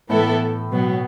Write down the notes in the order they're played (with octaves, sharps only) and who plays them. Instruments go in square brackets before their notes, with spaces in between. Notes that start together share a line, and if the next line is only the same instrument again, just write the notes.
[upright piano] A2 [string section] E3 B3 E4 A4
[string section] B2 F#3 B3